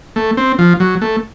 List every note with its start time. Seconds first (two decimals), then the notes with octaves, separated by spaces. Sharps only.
0.16 A3
0.37 C4
0.59 F3
0.80 F#3
1.01 A3